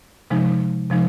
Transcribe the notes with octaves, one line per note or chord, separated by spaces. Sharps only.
C3 F3 G#3 D#4
C3 F3 G#3 D#4